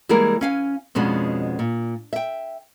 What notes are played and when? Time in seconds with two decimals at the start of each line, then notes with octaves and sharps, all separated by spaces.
0.09 E3 G3 G#3 A#3 G#4 A#4
0.41 C#4 F5 G#5
0.95 F2 B2 G#3 B3 C#4 D4
1.59 A#2
2.13 E5 G5